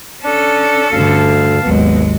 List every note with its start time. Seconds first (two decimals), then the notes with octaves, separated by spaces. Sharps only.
0.24 C#4 D4 A4
0.92 D2 G2 D3 F5 A5
1.63 G#1 D#2 F#3 G#3 B3